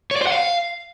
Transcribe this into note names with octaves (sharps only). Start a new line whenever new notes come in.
C#5
D5
C5
F#5
F5